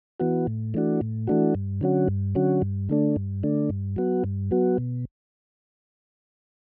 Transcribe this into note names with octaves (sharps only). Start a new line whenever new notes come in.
E3 B3 F#4
A2
E3 A3 D4 F#4
A2
E3 A3 D4 F#4
G2
D3 F#3 C#4 F#4
G2
D3 F#3 C#4 F#4
G2
D3 A3 D4
G2
D3 A3 D4
G2
F#3 B3 F#4
G2
F#3 B3 F#4
B2